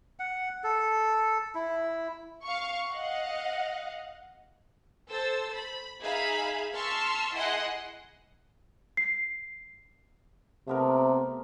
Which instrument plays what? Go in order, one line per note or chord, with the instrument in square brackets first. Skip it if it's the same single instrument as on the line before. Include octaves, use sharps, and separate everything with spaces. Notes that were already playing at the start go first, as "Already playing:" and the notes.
[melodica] F#5
A4
E4
[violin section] F5 C#6
D#5 F5 F#5
A4 C5 E6 A6
B5
D#4 G#4 E5 F5 B5
A5 C6 C#6 E6 F6 B6
E4 G#4 D#5 F#5 C6
[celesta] C7
[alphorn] C3 [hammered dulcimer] A3 B3 A#4